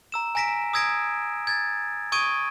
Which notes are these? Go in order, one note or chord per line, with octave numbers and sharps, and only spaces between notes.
A#5 E6 E7
G#5 A#5 A#6 B6 D7
D#6 E6 G#6 A#6 D7
G#6 A6
C#6 D#6 G#6 D7 D#7